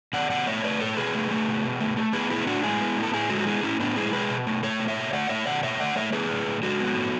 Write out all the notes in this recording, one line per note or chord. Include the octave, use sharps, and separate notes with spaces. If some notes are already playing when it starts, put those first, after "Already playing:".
B2 D5 F#5
B2 D5 F#5
A3 C#5 E5
A3 B4 D5
B2 A4 C#5
B2 G#4 B4
A3
A3
B2
B2
A3
A3
B3 G#4 B4
A2 E4 G#4
A2 D4 F#4
G#3 E4 G#4
B3
A2
A4
A2 E4 G#4
G#3 F#4 A4
F#4
B3 E4 G#4
A2 C#4 E4
A2 B3 D4
G#3 E4 G#4
B2 G#4 B4
B2
A3
A3 A4 C#5
B2
C#5 E5
B2
A3 D5 F#5
A3 C#5 E5
B2 D5 F#5
B2 C#5 E5
A3 D5 F#5
A3 C#5 E5
B3 G#4 B4
A2
A2
G#3 F#4 A4
B3
A2